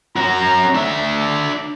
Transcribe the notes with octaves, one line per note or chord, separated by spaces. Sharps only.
C#4 F#4 A#5
D4 A4 E5